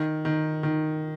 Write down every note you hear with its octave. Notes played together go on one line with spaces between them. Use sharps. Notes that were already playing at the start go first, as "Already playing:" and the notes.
Already playing: D#3
D#3
D#3